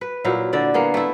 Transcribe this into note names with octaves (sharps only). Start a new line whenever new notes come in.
B4
A#2 F#3 E4 F5
D3 E4 D5
A#3 B3 G#4
A3 E4